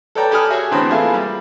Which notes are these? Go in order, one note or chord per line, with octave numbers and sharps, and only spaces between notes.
A4 B4 C#5 D5 G5 A#5
G4 A4 G#5 B5 D#6 F6
F#4 G#4 C#5 E5
E2 A2 D3 B3 C4
A#3 B3 E4 F4 G#4 A4
G3